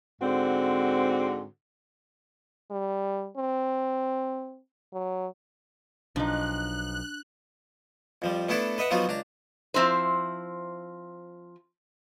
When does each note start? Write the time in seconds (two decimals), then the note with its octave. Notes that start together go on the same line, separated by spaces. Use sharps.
0.21 G#2 D3 C4 F#4
2.71 G3
3.37 C4
4.93 F#3
6.16 B1 F3 D4 D#4 F#6
8.22 F2 F3 G3
8.49 A3 B3 D4 E4 A4 D5
8.78 B4 D#5 E5 F#5
8.91 F3 F#3 B3 D#4 F4 F#4
9.08 C#2 D4 A#5
9.74 F3 C4 E4 C5